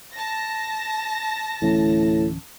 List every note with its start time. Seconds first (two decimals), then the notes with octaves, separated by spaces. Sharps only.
0.14 A5 A#6
1.62 D1 A2 E3 C#4